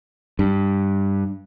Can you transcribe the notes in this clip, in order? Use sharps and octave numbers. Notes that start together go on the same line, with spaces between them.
G2